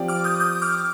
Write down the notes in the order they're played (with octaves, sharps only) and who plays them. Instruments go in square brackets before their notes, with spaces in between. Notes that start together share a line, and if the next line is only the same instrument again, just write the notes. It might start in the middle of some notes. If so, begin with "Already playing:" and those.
Already playing: [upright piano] F3 C4 G4 D5
[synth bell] D6 F6
D#6 G6
D#6 G6
D6 F6